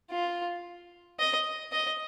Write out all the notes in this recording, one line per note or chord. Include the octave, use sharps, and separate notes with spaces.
F4
D#5
D#5